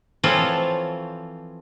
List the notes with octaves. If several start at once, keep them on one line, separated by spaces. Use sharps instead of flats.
E3 F3 C4 F4 A4 C#5